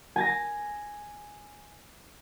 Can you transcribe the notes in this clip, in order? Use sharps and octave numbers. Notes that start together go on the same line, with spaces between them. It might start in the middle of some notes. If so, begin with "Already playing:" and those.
G#5 A6 A#6